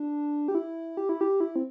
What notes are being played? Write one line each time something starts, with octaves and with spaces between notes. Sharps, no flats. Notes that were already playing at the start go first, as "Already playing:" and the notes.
Already playing: D4
G4
E4
G4
E4
G4
E4
C4